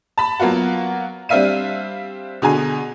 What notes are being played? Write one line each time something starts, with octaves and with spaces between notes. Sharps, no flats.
A5 B5
F#3 A#3 B3 F4 F#4
G3 C4 D4 E5 F5 D#7
B2 D3 G#4 G#5